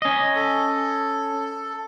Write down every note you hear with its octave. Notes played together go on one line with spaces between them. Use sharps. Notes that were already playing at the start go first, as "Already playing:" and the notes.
C#4 D#5
A4